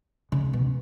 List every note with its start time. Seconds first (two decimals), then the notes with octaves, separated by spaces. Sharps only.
0.32 C#3
0.53 B2